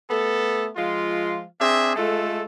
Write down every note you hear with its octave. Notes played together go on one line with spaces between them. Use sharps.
A3 B3 A4
F3 G#3 F4
C4 D4 G#4 E5
G#3 A3 F4 A4